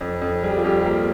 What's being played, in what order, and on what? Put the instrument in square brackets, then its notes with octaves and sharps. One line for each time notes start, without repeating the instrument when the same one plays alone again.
[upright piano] F2
F2
G3 G#4
G4
F4
F2 G4
G4
A#3 F4